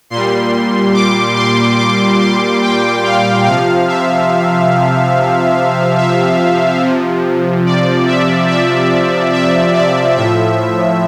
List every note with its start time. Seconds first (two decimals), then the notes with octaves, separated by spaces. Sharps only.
0.10 A#2 C6
0.16 G3
0.94 D6
1.37 C6
1.79 D6
2.21 C6
2.62 G5
3.04 F5
3.46 C3 F3 F5
3.88 E5
5.98 E5
6.82 C3 F3
7.66 D5
8.07 E5
8.49 E5
9.33 E5
9.75 D5
10.17 A2 F3 E5